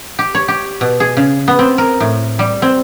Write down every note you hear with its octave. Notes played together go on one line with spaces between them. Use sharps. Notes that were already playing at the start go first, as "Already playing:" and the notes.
G4
C#5
G4
B2
G#4
C#3
B3
C4
A#4
A2
G3
C4